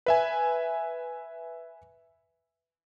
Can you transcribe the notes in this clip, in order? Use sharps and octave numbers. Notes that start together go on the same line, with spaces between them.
B4 E5 G#5